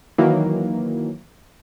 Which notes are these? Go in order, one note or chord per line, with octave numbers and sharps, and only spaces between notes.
D#3 E3 F#3 A#3